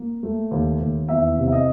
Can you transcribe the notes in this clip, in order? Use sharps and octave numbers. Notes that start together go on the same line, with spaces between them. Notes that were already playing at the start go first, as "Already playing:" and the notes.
Already playing: A#3
A3
D#2
D#2
E2 E5
C3
E5
D#5